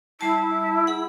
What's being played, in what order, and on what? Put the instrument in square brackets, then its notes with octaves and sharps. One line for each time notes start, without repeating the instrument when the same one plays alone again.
[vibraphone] G3 A5 [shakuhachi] E4
[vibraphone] G#4 F#5